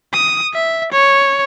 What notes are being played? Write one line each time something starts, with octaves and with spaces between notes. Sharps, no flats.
D#6
E5
C#5